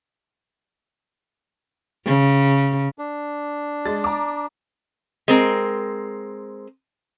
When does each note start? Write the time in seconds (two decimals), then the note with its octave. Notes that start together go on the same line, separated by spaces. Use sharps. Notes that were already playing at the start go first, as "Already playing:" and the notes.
2.06 C#3
2.99 D4
3.86 G#3 A6
4.04 A#5 D6
5.28 G#3 C4 A#4